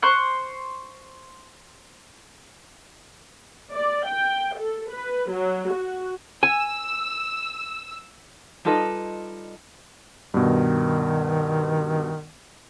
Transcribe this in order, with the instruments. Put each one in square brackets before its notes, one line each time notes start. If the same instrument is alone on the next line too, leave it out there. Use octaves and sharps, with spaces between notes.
[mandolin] C5 C6 C#6 F#6
[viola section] D5
G5
A4
B4
F#3
F#4
[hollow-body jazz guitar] G#5 [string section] E6
[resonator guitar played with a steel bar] G3 D#4 F4 A4 B4 D#5
[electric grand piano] G2 B2 [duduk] D#3